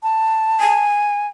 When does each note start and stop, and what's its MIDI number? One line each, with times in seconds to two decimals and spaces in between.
0.03 0.83 81
0.60 1.27 80